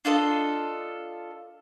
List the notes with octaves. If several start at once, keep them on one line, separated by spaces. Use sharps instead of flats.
D4 F4 A4 D#5